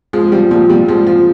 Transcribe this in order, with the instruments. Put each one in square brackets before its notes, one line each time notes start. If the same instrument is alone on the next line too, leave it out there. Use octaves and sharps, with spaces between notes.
[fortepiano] F3 G#3
F3 G3
A#2 F3
A#2 G3
F3 G#3
F3